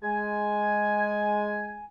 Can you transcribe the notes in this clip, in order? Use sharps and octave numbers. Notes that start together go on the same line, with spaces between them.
G#3 G#5